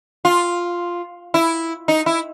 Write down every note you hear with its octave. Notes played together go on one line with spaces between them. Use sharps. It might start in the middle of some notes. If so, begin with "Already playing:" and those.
F4
E4
D#4
E4